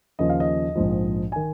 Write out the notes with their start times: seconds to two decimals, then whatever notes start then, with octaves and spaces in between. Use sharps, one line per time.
0.19 D#2 C#3 F3 D#5
0.30 F5
0.40 D#5
0.75 A#1 G#2 F3
1.32 D#3 G#5